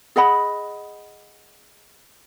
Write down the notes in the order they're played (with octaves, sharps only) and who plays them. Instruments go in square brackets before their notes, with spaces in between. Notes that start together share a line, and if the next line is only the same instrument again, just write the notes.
[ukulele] G#4 D#5 F#5 B5